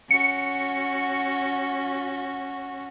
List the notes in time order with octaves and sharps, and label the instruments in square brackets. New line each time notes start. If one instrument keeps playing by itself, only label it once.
[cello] C#4 F#4 [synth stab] C#7